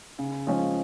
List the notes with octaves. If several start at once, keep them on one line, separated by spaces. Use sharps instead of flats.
C#3
F3 G#3 C#4